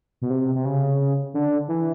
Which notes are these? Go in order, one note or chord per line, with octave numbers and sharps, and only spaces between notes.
B2
C3
C3
C#3
D3
E3